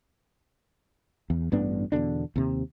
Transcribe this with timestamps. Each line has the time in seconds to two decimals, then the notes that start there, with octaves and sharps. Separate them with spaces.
1.30 E2
1.52 A1 G2 B3 D4
1.92 E2 B2 D3 D4
2.36 D#2 C3